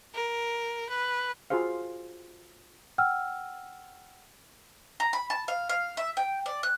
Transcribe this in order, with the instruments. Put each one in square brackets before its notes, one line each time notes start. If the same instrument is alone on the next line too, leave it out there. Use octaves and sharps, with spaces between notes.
[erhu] A#4
B4
[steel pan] F4 F#4 G#4 C5 F5
[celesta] F#5 G5 E6 F6
[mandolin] A#5
B5
A5
F5
F5
E5
G5
D5
F#6